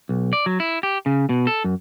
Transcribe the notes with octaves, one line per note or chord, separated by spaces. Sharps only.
B1
D5
F#3
E4
G4
C#3
B2
A4
F#2